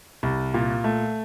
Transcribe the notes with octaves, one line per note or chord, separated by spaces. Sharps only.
C2
A#2
A3